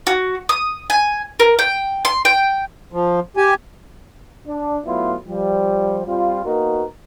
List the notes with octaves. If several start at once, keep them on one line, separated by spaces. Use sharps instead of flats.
F#4
D#6
G#5
A#4
G5
C6
G5
F3
G4 G#5
D4
F#3 A3 B3 E4 F4
F3 G3
G3 C4 F4
A#3 B3 D#4 F#4 A#4